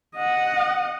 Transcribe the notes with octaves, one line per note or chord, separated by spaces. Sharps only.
D#5 F#5